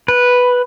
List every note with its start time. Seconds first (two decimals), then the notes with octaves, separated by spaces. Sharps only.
0.08 B4